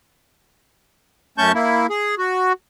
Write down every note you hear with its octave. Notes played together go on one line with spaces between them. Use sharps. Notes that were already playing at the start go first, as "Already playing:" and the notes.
F#2 A3 C#4 A5 C#6 G6
A#3 E4
G#4
F#4